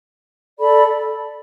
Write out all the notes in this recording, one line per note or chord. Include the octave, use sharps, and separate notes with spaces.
A4 D5 B5